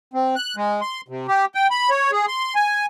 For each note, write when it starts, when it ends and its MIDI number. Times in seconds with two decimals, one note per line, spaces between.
0.14 0.35 60
0.36 0.55 90
0.56 0.81 56
0.81 1.01 84
1.08 1.27 48
1.28 1.45 67
1.55 1.67 79
1.71 1.90 83
1.90 2.11 73
2.12 2.26 68
2.27 2.55 84
2.55 2.86 80